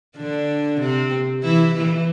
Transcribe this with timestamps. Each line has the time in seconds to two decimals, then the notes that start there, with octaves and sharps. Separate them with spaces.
0.17 D3 D4
0.80 C3 C4
1.42 E3 E4
1.74 E3 E4